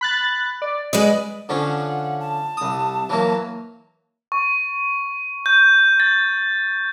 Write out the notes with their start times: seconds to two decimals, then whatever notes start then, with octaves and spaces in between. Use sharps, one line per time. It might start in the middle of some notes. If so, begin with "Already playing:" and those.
0.01 B5 F#6 A6
0.62 D5
0.93 G#3 B4 D5 D#5
1.49 D3 F3 C#4 F#5
2.20 A5
2.57 C2 D#6
3.10 E3 F#3 A#3
4.32 C#6
5.46 G6
6.00 A6